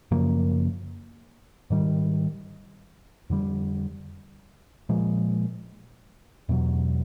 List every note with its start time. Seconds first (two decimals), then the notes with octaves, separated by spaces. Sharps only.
0.11 F#2 C#3 F3 A#3
1.70 G#2 D#3 G3
3.30 F2 D3 G3
4.89 A#2 F3 G#3
6.49 E2 B2 F#3